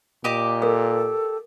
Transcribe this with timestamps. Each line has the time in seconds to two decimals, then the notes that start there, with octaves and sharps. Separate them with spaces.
0.24 A#2 G4 D#5 D6
0.62 A4 A#4 D#6